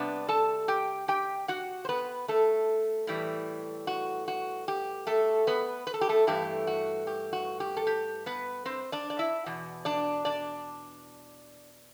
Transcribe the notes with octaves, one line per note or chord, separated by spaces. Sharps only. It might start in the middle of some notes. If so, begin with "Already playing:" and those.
Already playing: C3 G3 B3 D4
A4 A5
G4 G5
G4 G5
F#4 F#5
C5
B3 B4
A3 A4
A2 E3 G3
F#4
F#4
G4
A3 A4
B3 B4
B4
A4
G4
A3 A4
G2 E3 A3 G4
F#4
G4
F#4
G4
A4
G4
B3 B4
C4 C5
D4 D5
D5
E4 E5
E2 B2
D4 D5
D4 D5